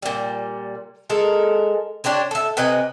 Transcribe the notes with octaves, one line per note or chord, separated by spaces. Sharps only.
A#2 G3
G#3 A4 A#4
D4 G4 C5 C#5
A4 E5
C3 B4 D#5 G#5